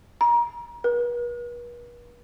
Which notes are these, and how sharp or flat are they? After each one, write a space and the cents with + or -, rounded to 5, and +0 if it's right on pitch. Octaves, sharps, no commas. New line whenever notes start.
A#5 +30
B4 -40